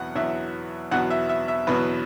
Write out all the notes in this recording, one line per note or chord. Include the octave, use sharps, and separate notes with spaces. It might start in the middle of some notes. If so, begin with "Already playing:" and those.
Already playing: E2 B2 F#3 F#5
E2 B2 F#3 E5
E2 B2 F#3 F#5
E5
E5
E5
E2 B2 F#3 B4